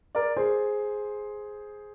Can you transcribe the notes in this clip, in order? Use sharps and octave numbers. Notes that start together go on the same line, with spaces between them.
A#4 D5
G#4 C5